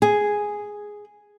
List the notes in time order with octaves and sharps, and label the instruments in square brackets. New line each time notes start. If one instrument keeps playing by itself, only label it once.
[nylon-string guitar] G#4